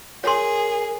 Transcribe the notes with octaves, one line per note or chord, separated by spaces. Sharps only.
G#4 A#4 C#5 C6